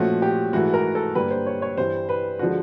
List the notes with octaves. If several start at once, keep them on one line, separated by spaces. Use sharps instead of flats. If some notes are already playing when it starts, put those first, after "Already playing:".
Already playing: A#2 F3 A3 C#4 F#4
G4
G#2 E3 A3 F#4
A#4
A4
G2 D3 G3 A#3 B4
C5
C#5
C#5
G2 E3 G3 C5
B4
D3 F3 G#3 F#4